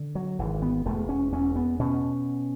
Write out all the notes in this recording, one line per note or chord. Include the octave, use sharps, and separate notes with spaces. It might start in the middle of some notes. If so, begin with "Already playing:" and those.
Already playing: D3
F#3
G#1 E3
B3
E1 A3
C#4
E2 C#4
B3
B2 C#4